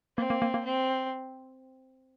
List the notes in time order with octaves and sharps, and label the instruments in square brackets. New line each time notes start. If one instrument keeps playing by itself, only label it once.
[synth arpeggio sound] A#3 [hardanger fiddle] C4
[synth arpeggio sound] A#3
A#3
A#3
[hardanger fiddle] C4